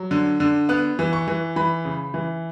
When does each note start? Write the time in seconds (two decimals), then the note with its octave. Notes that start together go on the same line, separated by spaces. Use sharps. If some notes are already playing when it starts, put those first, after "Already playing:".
Already playing: F#3
0.11 D3
0.40 D3
0.69 B3 F#6
0.99 E3
1.13 C#6
1.28 E3
1.56 E3 B5
1.85 C#3
2.14 E3